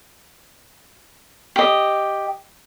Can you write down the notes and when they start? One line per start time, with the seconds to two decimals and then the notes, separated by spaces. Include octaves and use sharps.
1.56 G4 D#5